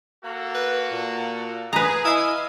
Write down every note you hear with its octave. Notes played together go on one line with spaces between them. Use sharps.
A#3 F#4 A4
B4
A#2
G#4 B4 A#5
E4 D#5 F5 G#5